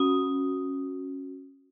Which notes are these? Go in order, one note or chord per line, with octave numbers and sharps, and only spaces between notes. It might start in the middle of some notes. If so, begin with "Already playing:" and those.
Already playing: C#4 F#4 D#6